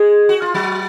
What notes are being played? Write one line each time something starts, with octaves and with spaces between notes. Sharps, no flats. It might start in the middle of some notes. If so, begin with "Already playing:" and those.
Already playing: G#3 G#4
F#4
F4
F#3 F#4